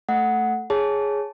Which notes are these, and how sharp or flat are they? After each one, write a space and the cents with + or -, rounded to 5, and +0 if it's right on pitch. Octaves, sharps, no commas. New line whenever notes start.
A3 +0 F#5 +0
G#4 +0 C#5 +0 A5 +0